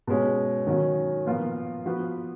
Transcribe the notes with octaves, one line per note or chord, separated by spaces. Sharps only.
B2 G#3 C#4
D#3 F#3 C#4
A#2 F3 B3 F4 A#4
F3 B3 F#4 B4